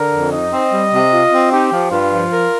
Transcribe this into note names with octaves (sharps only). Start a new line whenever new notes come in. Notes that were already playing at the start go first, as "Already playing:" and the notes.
Already playing: D3 A#4
F2
D#4 D#5
C4
G3
C3
F4
C4
D#4 G4
F3
G2 F4
F3
A#4